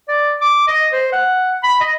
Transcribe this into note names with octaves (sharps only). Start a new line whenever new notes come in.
D5
D6
D#5
C5
F#5
B5
D#5